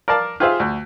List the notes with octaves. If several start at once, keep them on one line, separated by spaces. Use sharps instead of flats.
A#4 D5 F5 A5
F4 G4 G#4 C5 E5 F5
D2